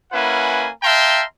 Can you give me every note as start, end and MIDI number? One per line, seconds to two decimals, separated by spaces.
0.12 0.69 58
0.12 0.69 61
0.12 0.69 64
0.12 0.69 71
0.12 0.69 78
0.12 0.69 80
0.83 1.24 76
0.83 1.24 77
0.83 1.24 79
0.83 1.24 81
0.83 1.24 82
0.83 1.24 84